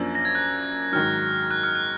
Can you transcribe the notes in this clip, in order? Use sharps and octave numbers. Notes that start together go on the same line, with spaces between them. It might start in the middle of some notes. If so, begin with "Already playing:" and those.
Already playing: F#2 F3 A#3 D4
A#6
G#6
F#6
G#2 D#3 F#3 F6
F#6
F6
F#6